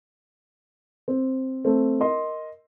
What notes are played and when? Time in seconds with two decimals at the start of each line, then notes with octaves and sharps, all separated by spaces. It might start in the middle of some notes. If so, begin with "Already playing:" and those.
1.08 C4
1.65 A3 C4
2.00 A#4 D#5 C6